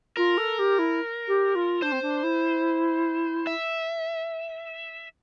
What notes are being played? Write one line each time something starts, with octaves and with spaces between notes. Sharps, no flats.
F4 A#4
A4
G4
E4
G4
F4
D4 C5
C4
D4
E4
E5